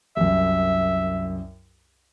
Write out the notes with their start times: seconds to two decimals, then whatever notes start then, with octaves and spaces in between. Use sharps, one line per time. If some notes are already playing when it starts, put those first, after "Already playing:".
0.17 C2 F#2 E5